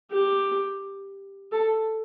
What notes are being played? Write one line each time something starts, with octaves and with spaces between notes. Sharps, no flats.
G4
A4